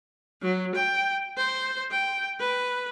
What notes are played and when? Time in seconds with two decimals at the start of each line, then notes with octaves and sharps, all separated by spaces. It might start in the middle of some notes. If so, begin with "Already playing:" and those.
0.42 F#3
0.75 G5
1.37 C5
1.91 G5
2.40 B4